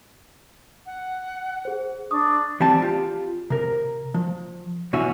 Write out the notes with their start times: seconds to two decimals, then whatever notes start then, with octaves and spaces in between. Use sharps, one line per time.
0.86 F#5
1.65 G#4 C5
2.11 D4 C#6 D#6
2.60 E3 G3 C4 G5 A5
2.82 F4 G4
3.50 C3 A#4
4.14 F3
4.93 B1 B2 E3 C#4 F#4 E5